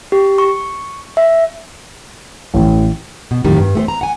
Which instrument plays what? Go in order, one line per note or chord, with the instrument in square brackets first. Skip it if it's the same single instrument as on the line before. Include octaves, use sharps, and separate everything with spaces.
[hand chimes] G4
C#6
E5
[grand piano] A1
[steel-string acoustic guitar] B2
F2 A2 D#3 F#3 G3
G2
A3 G4 C5
A#5
F#5 G#5